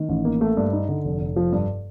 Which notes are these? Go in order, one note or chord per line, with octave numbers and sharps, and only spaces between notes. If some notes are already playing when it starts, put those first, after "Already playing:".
Already playing: D#3
A1
A#3
A3
G2
D#4
D3
F1
F1
F3
G2